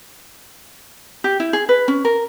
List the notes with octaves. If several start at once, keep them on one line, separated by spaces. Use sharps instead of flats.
G4
E4
G#4
B4
C#4
A#4